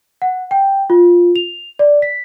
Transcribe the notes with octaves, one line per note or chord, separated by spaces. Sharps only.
F#5
G5
F4
F7
D5
B6